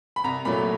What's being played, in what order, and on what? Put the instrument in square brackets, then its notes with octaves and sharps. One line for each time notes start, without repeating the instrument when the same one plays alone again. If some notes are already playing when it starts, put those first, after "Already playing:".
[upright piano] B5
C2 A#5
A#2 F#3 A3 B5